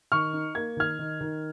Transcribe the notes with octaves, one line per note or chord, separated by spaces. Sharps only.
D#3 C#6 F6
D#4
A#3 G#6
D#3 F6 G#6
D#3
D#3